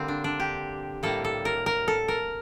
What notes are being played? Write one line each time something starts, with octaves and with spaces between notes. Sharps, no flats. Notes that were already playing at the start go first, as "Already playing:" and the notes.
Already playing: D3 G3 A#3 C4
D4
D4
G4
A2 G3 A#3 A4
A4
A#4
A#4
A4
A#4